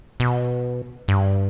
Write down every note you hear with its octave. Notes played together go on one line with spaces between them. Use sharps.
B2
G2